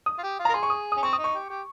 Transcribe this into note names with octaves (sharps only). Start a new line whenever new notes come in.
D#6
F4
G4
F4
A#5
A#4
G#4 C6
C#6
D#6
C#4 D#6
C4 C#6
D#4 D#6
C#6
G4
G4